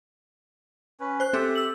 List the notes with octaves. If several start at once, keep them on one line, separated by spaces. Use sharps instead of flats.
C#4 B4
C5 F#6
C4 G4 A4 E5
E6 F#7